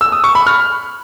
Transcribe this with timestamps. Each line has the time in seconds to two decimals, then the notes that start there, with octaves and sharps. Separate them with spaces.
0.01 E6
0.12 D#6
0.24 C#6
0.35 B5
0.47 F6